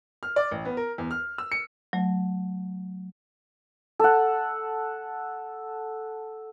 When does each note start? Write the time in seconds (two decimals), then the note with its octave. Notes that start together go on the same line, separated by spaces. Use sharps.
0.23 F6
0.36 D5
0.51 A1
0.65 B3
0.77 A#4
0.98 E2
1.11 F6
1.38 E6
1.52 C#7
1.93 F#3 A3
4.00 A4 F#5